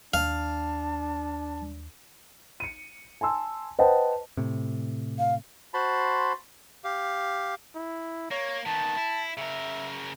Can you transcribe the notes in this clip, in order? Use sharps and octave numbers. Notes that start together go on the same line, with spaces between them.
D#2 D4 F5 A5
C#7 D#7
G#5 A5 C6 E6
B4 C5 D#5 F#5 G5 A5
A2 C3
F5
F#4 C5 A5 B5 C6
G4 F5
E4
A#3 C#5
D#3 B3 A5
E4
C#3 A#4 E5